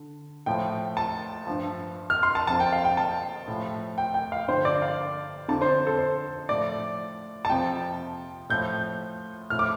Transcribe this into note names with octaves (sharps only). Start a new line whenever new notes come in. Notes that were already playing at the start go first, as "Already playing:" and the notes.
Already playing: D3
A2 F3 G5
A5
G2 F3
F6
C6
A5
F2 F3 A5
G5
F5
G5
A5
A2 F3
G5
G5
F5
G2 D3 F3 C5
D5
F5
F2 D3 F3 A5
C5
A4
C5
A2 F3 D5
A5
F2 C3 F3 G5
A2 F3 G6
A2 F3 F6
D6